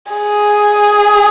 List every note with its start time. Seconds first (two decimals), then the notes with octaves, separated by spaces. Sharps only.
0.12 G#4